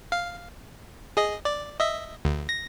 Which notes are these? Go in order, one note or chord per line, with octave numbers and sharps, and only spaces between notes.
F5
G#4 D#5
D5
D#5 E5
D2
A#6